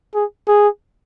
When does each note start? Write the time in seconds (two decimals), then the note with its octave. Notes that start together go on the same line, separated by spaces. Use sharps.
0.14 G#4
0.48 G#4